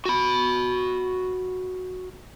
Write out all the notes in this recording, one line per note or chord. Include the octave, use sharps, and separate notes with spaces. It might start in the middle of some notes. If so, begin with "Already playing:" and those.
F#4 B5